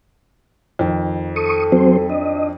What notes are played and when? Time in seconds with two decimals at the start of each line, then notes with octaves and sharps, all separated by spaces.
0.79 F2 D#3
1.36 A4 C#6 D#6
1.72 F#3 C4 C5
2.10 D4 D#5